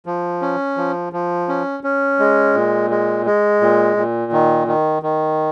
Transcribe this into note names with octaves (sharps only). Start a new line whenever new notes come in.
F3
C#4
F3
F3
C#4
C#4
G#3
A#2
G#3
G#3
A#2
A#2
D#3
D#3
D#3